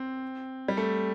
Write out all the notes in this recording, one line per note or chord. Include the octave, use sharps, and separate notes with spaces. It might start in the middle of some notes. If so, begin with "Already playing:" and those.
Already playing: C4
G3
A3